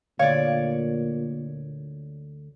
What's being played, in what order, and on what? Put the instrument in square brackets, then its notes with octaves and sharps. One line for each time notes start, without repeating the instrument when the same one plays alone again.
[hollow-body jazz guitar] D2 [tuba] A#2 [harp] C#5 D5 [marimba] F5